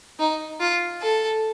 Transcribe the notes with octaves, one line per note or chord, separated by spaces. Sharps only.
D#4
F4
A4